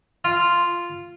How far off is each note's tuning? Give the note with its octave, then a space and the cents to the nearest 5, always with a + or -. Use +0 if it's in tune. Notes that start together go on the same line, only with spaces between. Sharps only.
F4 -5